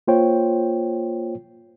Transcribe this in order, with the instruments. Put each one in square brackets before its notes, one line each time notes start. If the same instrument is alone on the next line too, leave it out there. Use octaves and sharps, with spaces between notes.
[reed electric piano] A#3 F4 C5 C#5 G5